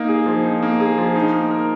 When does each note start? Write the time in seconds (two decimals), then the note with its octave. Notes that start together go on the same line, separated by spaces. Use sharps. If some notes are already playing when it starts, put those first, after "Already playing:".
Already playing: A#3 D#4
0.08 G#4
0.26 F3
0.44 D#4
0.62 A#3
0.80 G#4
0.98 F3
1.16 D#4
1.33 A#3
1.51 A#4